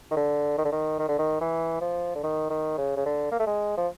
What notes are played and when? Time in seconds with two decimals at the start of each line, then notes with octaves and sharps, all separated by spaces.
0.11 D#3
0.16 D3
0.58 D#3
0.65 D3
0.72 D#3
0.99 D#3
1.09 D3
1.18 D#3
1.41 E3
1.81 F3
2.15 D3
2.23 D#3
2.50 D#3
2.78 C#3
2.96 C#3
3.05 D3
3.31 A#3
3.40 A3
3.47 G#3
3.77 F3